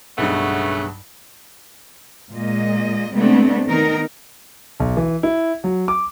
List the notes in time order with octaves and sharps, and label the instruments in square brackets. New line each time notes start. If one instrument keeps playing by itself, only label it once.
[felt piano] B1 G2 [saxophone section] C#3 A3 B3
[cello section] A#2 G#3 D#5
C3 G#3 A3 B3 C4 D4
D#3 B3 D#4 A#4
[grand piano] B1
E3
E4
F#3
D6